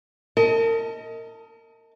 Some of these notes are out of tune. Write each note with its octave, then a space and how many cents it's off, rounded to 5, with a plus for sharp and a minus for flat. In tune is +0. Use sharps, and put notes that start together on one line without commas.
A#4 -35 D#5 +25 A5 +0